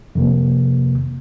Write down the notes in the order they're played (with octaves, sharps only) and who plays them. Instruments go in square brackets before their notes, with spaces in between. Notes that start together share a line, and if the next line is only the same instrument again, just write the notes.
[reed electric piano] F2 C3 A#3